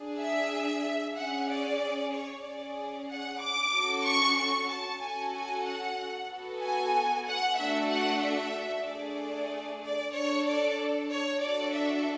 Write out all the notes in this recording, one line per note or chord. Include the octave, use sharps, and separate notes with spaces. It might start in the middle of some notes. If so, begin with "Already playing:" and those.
Already playing: D4 G#4
E5
C#4 G#4 F#5
D5
C#5
C#4 G#4 D5
F#5
D6
C#4 F#4 A4
C#6
C#6
A5
C#4 F#4 A4 G#5
G#5
F#5
B3 F#4 A4
G#5
F#5
A3 D4 F#4 A4 E5
F#5
E5
A3 D4 G#4 D5
D5
D4 A4 C#5
D5
C#5
D4 F#4 A4 D5
E5